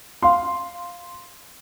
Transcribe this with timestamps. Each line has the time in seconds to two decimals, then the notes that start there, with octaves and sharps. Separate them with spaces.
0.23 F5 C6